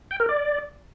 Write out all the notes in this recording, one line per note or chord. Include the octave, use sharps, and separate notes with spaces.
G5
A#4
D5